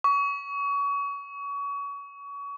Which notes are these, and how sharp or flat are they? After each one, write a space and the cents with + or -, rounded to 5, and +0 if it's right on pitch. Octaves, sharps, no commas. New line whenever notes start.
C#6 +30